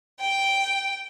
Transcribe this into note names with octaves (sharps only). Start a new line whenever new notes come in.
G5